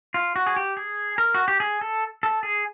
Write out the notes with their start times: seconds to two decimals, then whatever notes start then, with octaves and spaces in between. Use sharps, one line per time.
0.14 F4
0.36 F#4
0.47 G#4
0.56 G4
0.77 G#4
1.18 A#4
1.35 F#4
1.48 G4
1.60 G#4
1.81 A4
2.23 A4
2.43 G#4